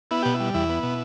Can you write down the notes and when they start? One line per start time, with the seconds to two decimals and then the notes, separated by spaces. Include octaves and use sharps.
0.11 B3 E4
0.22 B2 G4
0.34 E4
0.40 G3
0.54 E2 E4
0.69 B3
0.83 B2